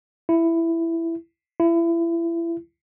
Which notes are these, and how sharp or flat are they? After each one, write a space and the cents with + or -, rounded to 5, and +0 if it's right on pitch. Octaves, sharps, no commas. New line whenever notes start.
E4 +10
E4 +30